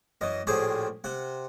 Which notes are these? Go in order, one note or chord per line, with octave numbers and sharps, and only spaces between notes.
F#2 E3 D#5
A#1 A2 G4 G#4 C5
C3 F#5